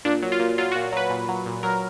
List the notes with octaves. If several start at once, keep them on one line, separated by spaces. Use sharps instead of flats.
A#2 D4
F#3
F4
A#2
F#3 F4
F#4
A#2
F#3 B4
A#2
F#3
A#2
F#3 A#4